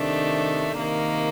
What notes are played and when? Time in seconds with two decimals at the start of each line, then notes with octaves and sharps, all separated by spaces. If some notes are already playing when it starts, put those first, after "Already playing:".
Already playing: C3 D#3 A3 D4
0.77 C3 D#3 A#3